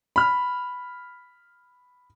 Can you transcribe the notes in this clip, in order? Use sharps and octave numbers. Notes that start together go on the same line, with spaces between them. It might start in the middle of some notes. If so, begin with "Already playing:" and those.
B5 F6